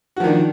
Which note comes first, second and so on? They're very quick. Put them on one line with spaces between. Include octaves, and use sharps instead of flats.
F#4 F3 D#3 D4